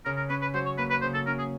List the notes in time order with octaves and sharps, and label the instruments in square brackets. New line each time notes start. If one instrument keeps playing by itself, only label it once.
[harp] C#3 [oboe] A#4
[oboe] A#4
[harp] C#4 [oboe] B4
[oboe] B4
[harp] F#3 [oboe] C5
[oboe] C#5
[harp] A#3 [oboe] B4
[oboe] B4
[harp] C#3 [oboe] C5
[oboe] A4
[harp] C#4 [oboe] A#4
[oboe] G#4